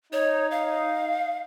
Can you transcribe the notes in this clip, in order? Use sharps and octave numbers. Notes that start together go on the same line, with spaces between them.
D#4 C#5
F5